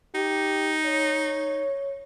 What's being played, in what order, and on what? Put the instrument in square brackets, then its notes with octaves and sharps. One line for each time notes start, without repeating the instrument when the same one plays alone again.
[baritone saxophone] D#4 [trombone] G4
[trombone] C#5